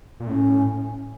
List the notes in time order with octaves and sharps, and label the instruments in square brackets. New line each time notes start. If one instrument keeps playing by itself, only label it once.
[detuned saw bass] A#2
[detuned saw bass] A2 [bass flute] C#4